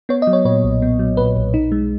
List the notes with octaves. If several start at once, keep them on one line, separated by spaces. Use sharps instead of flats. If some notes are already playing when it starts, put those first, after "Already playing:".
B3 C#5
D#5
F#3
C#5
A#2 C#5
B1
B3
F#3
A#2 B4
B1
D#4
G#3